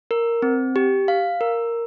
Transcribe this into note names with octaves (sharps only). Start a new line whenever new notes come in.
A#4
C4
G4
F5
A#4